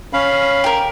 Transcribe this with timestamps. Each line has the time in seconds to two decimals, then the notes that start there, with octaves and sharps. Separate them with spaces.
0.13 C#4 F5 B5
0.64 G4 A#4